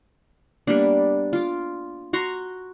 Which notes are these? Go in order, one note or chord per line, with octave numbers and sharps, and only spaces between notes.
G3 A#3 B3 D4
F4 D6
F#4 A#5 C6 C#6